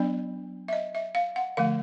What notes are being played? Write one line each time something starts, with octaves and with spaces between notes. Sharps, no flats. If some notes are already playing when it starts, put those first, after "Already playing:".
Already playing: F#3 B3 D4 D5
E5
D#5
E5
F5
F#5
D3 F3 A3 F5